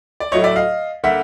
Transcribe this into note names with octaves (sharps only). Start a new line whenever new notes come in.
D5
A2 F#3 A3 C#5 D#5
D5 E5
D#5 F5
D3 G3 A#3 E5 F#5